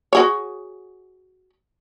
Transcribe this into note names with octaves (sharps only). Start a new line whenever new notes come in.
F#4 G#4 C#5